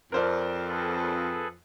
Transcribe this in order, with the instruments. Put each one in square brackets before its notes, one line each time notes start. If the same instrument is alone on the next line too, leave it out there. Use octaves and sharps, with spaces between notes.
[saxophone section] F2 [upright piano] A#4 C5 D5
[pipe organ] G#4 A4 B4